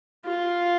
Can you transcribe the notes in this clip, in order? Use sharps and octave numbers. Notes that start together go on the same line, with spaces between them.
F4